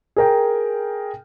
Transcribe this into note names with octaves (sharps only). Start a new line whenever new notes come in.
G#4 A#4 G5